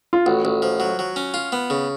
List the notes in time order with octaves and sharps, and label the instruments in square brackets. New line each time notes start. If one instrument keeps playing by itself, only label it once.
[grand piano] F4
[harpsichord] A1 [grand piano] F#4
[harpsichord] A1
F3
F#3
F#3
C#4
F4
B3
C#3